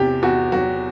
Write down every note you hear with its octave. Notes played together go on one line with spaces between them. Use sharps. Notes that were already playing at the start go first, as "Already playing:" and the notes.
Already playing: E2 C3 G4
E2 F#4
F#3 F#4